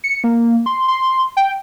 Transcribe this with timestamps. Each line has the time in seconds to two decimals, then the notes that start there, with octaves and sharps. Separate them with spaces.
0.04 C#7
0.24 A#3
0.66 C6
0.88 C6
1.37 G5